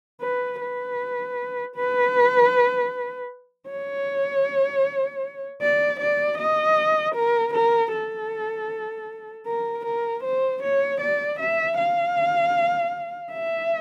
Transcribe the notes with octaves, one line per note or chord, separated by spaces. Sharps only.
B4
B4
B4
C#5
D5
D5
D#5
A#4
A#4
A4
A#4
A#4
C5
C#5
D5
E5
F5
E5